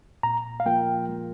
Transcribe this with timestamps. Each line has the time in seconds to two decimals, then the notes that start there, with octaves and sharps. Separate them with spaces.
0.23 A#2 A#5
0.60 F5
0.66 F3 A#3 F4 A#4 G5
1.09 G#3